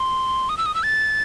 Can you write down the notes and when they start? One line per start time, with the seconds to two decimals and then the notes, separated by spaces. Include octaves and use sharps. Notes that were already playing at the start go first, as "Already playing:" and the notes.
Already playing: C6
0.49 D#6
0.58 E6
0.66 D#6
0.75 E6
0.83 A6